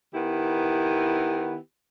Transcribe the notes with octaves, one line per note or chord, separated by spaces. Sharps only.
D#3 B3 E4 G4